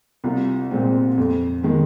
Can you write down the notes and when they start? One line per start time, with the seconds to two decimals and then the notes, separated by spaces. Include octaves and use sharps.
0.24 C2 F4
0.71 A#2 G#3 C4
1.17 F2
1.63 D#3 G#3